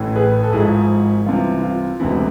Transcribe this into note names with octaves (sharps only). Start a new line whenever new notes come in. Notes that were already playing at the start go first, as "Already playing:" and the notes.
Already playing: A1 A2 E3
G#4 B4
A4
G#1 G#2 F3 E4 G#4
C2 C3 E3 F4
E4
F4
E1 D2 C3 E3 E4